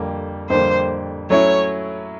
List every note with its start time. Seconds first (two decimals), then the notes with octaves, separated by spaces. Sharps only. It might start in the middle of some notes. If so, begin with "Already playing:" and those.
Already playing: F2 D3 G3 A#3
0.50 F2 D3 G3 A#3 C5
1.30 F#3 A3 C#4 E4 C#5